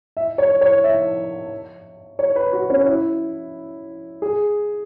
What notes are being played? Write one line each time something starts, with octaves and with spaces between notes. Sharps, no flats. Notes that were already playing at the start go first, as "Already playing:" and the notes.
E5
C#5
C#5
E5
C#5
B4
F#4
C#4
E4
G#4